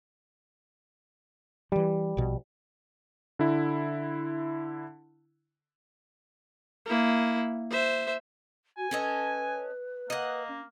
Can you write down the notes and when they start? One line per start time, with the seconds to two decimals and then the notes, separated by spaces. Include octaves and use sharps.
1.72 E3 F3 G3
2.17 A#1 B2
3.39 D3 E4
6.86 A#3 E4
7.71 C5 E5
8.78 F#4 G#5
8.91 C#4 A4 B4 D#5
10.10 A#3 D#5 F#5
10.48 C#4